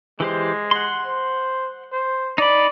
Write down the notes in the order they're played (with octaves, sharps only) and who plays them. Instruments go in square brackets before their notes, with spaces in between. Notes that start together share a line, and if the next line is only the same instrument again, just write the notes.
[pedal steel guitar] E3 G4 C5 [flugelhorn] G#3
[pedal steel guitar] F#5 C6
[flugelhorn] C5
C5
[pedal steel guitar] D#4 B5 [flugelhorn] D5